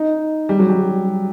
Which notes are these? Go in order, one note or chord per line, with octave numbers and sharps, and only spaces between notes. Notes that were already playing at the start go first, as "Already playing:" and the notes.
Already playing: D#4
G3
F#3
G3